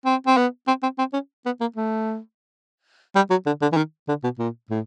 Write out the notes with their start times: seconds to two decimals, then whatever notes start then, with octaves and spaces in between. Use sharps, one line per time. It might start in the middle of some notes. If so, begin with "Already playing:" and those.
0.05 C4
0.27 C4
0.37 B3
0.67 C4
0.83 C4
0.98 C4
1.13 C#4
1.45 B3
1.61 A#3
1.76 A3
3.16 G3
3.30 F#3
3.46 D3
3.61 D3
3.72 E3
3.77 D#3
4.08 D3
4.24 B2
4.39 A#2
4.70 A2